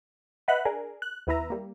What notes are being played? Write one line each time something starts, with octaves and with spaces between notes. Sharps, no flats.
B4 D#5 E5 F#5 B5 F#6
D4 G#4 A#4
F#6
D#2 B3 E4 B4 E5 A#5
G3 A#3